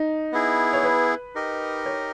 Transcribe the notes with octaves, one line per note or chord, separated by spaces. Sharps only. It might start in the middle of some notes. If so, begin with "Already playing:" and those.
Already playing: D#4
B3 E4 G#4
C#5
B4
D#4 G4 A#4 D#5
C#5